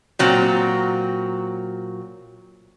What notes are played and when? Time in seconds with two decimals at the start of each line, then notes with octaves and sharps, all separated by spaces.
0.19 A#2 F#3 C4